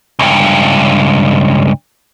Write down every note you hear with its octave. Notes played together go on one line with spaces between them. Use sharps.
C#2 G2